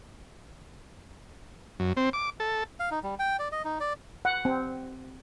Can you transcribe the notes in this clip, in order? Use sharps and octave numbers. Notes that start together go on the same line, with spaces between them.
F#2
C4
D6
A4
F5
D#4
G3
G5
D5
D#5
D#4
D5
F#5
C4